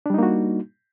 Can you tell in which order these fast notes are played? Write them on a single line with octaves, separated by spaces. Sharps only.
D4 G3 D#4 A#3 F#4